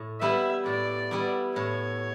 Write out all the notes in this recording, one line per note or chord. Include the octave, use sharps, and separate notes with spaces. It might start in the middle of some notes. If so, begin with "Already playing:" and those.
Already playing: A2
G3 B3 E4 E5
A2 D5
G3 B3 E4
A2 C#5